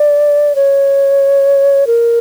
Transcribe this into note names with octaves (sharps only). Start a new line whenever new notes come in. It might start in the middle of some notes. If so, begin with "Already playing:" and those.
Already playing: D5
C#5
A#4